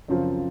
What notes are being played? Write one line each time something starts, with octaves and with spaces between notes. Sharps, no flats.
F#2 C#3 F3 C4